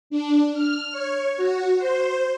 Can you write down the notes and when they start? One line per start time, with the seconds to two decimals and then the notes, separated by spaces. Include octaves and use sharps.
0.10 D4
0.53 F6
0.91 C#5
1.37 F#4
1.78 C5